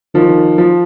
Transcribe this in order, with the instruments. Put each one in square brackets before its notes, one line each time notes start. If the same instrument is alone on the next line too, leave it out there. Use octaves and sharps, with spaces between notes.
[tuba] D#3 [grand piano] F3
[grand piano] F3